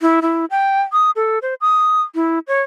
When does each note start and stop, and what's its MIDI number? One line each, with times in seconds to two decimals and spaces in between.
0.02 0.20 64
0.22 0.45 64
0.50 0.81 79
0.92 1.11 87
1.16 1.39 69
1.42 1.54 72
1.61 2.02 87
2.15 2.39 64
2.48 2.62 73